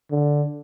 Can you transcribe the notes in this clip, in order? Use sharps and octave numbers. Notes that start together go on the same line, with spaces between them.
D3